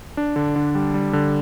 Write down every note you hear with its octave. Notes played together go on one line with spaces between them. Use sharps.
D4
D3
D3
G3
G3
D3